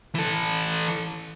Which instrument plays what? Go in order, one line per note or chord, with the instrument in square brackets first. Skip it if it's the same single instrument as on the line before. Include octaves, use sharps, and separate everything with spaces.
[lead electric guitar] E3 A4